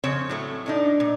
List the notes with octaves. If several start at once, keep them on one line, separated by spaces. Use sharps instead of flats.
F2 C#3 C4 C#5
A2 F#3 A3
A2 D4 D#4
A#2